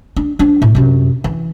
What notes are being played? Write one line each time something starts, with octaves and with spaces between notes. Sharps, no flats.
D4
F3 D4
A2
F#2 C3
E3